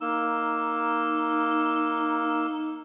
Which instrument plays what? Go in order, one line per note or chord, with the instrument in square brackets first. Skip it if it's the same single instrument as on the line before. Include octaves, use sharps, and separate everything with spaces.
[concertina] A#3 E6 [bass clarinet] D#4